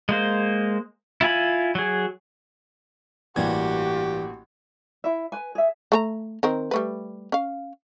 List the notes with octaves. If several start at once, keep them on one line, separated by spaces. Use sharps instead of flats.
G#3 A#3 C5
E4 F4 G#5 B5
F#3 G#4
A1 G2 E3 G3 A#3 F#4 G4 G#6
E4 E5
B4 G#5
G#4 E5
A3 A4 A#5
D#3 C4 A#4
G3 A3 B4
C#4 F5